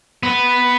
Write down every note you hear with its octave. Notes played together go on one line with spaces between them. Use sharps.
B3